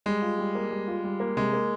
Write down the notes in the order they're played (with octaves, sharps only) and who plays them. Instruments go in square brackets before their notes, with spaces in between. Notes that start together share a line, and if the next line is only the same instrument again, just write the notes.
[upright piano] G3 [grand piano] G#3
[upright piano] F4
G3
A#3
G3
F4
G3
A#3
[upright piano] C3 [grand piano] G#3
[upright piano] A#3